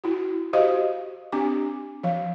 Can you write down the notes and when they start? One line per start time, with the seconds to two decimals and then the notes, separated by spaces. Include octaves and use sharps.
0.04 E4 F#4
0.53 F#4 G4 C5 D#5 F5
1.32 C4 D4 G4 D6
2.03 F3 F5